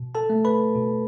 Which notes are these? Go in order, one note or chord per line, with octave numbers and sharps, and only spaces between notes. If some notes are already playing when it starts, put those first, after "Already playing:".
Already playing: B2
A4 A5
A3
B4 B5
B2